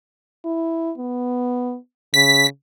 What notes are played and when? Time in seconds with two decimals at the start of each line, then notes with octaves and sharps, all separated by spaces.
0.45 E4
0.98 B3
2.14 C#3 B6